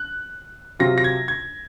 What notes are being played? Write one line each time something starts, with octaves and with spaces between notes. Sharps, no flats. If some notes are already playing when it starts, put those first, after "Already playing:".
Already playing: F#6
C3 F#3 C4 F4 A#6
A#6
G#6
G#6